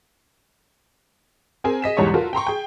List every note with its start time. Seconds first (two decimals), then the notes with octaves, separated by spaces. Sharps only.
1.64 C4 G#4 A#4 G#5
1.82 G#4 D#5 B6 E7
1.97 B1 E2 G#2 G3 C#5 C#6
2.14 F4 F#4 A4 A#4
2.33 G5 A#5 C6 C#6
2.47 G#4 G5